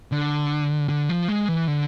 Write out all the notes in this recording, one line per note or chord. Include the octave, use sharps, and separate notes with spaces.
D3
D3
F3
G#3
E3
D3